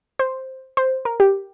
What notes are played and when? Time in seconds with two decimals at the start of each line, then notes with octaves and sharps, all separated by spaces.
0.19 C5
0.77 C5
1.05 A#4
1.20 G4